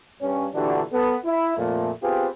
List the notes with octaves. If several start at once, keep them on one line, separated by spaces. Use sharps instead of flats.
G2 C#4
A#2 D3 E3 D4 F#4 G4
B3 A4
E4
F2 A#2 A3
B3 C4 F4 G4 G#4 B4